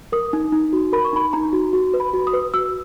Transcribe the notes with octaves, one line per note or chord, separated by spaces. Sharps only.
A#4 D#6
D#4
D#4
F#4
A#4 B5
C#6
D#4 B5
D#4 A#5
F#4
F#4
B4
B5
F#4
D#6
B4
F#4 E6